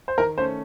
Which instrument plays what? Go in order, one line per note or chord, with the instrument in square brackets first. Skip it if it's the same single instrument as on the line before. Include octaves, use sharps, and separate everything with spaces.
[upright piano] C5
[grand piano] D#3 [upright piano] A#4
[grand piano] A3 C#4 [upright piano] C5